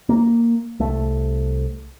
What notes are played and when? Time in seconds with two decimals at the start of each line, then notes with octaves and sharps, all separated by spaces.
0.09 A#3
0.80 C2 A3